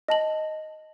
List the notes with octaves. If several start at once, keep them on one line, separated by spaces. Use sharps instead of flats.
D#5 A5 F#7